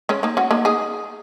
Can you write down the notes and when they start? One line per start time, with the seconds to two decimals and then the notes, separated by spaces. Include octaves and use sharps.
0.09 G#3 C#4
0.23 A#3 D#4
0.37 C#4 F#4
0.51 A#3 D#4
0.65 D#4 G#4